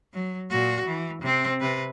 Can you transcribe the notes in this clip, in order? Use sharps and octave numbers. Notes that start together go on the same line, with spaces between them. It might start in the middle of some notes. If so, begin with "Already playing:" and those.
F#3
A#2 F#4
E3
C3 C4
C3 B4